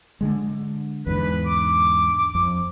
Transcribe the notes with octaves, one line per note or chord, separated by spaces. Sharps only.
D3 G#3
E2 G#2 D3 B4
D6
F2